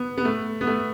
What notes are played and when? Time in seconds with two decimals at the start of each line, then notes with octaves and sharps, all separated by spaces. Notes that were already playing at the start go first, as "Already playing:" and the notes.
Already playing: B3
0.18 B3
0.25 A3
0.61 B3
0.67 A3